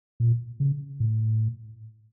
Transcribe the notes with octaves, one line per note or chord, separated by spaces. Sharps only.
A#2
C#3
A2